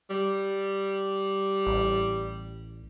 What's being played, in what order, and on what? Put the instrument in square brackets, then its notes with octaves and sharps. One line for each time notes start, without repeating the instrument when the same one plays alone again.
[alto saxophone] G3
[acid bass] A1